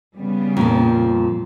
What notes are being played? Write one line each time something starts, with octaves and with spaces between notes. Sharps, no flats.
C#3 G3 B3
F2 A#2 F3